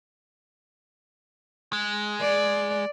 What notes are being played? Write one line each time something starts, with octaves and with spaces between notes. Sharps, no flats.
G#3
D5